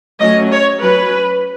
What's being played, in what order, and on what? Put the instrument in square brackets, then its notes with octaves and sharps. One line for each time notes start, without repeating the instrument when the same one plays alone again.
[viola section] F#3 A3 C#4 D#5
C#5
F#3 C#4 B4